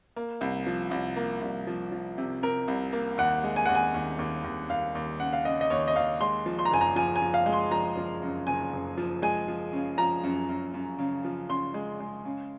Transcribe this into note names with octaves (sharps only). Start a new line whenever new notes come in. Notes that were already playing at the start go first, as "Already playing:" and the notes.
A#3
C2
F3
C2
A#3
C2
F3
F3
C3
C3 A#4
C2
A#3
D#2 F#5
G#3
G#5
D#2 F#5
G#5
D#2
D#2
D#2
D#2 F5
D#2
C#3 F#5
F5
C#3 D#5
D#5
D#2 C#5
D#5
D#2 F5
G#3 C6
F3
C6
A#5
F#1 G#5
A#5
F3 G#5
G#5
F3
F5
G#3
C6
F3 A#5
F3
F#2
F#1 G#5
F#1
F3
G#3 G#5
F3
C#3
F3 A#5
F#2
F#2
F#2
C#3
F3
C#3 C6
G#3
G#3
C#3